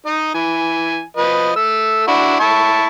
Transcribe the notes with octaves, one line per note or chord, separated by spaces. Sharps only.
D#4 D#5
E3 G#5
F3 B4 D#5
A3 E6
D4 E4 F#4
E4 A5 C#6